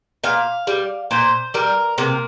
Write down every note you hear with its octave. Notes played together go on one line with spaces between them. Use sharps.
A#2 F5
G3
A#2 C5
G3 A#4
C3 A#3